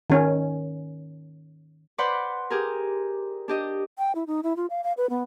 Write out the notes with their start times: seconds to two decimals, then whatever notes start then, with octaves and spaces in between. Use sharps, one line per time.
0.10 D#3 C#4
1.98 B4 C5 D5 F#5 B5 C6
2.50 G4 G#4 A#4
3.48 D4 G4 D#5
3.98 G5
4.15 E4
4.27 D#4
4.43 E4
4.56 F4
4.70 F5
4.84 F5
4.97 B4
5.10 B3